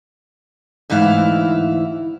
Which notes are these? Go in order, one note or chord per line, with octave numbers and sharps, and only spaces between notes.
D2 G#2 E3 E4 F5